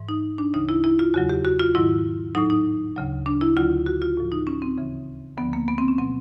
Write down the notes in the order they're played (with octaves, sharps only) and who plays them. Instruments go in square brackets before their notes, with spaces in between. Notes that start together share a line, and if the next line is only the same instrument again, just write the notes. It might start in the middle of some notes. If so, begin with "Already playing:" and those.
Already playing: [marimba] G#2 E3
D#4
D4
D2 C#3 E3 D#4
E4
E4
F4
E2 C#3 F#3 F#4
G4
F#4
F4
G#2 D#3 F#3 E4
A2 F#3 D#4
D#4
D2 C#3 F#3
D4
E4
D2 D3 F#3 F4
F#4
F4
A2 F3
D#4
C#4
C4
D#2 C#3 E3
D2 D3 F3 B3
A#3
B3
C4
C#4
B2 F#3 C4